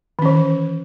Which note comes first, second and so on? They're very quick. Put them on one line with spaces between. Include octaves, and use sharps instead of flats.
D#3 C#4 E3